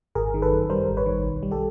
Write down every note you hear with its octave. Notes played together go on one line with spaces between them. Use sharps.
G#1 G#4 A#4
D#3
A4 B4
F#2
G3 A#4 C5
G#1
B4 C#5
D#3
B1
G3
G4 A4